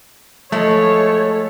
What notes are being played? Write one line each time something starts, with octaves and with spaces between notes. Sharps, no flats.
F3 G#3 A3 A4 C#5